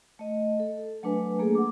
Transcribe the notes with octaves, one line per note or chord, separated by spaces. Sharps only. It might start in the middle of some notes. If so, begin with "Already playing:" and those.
A3 D#5
A4
F#3 A3 D4 B4 G#5
A3 A#3 G#4 A4
F#5 D6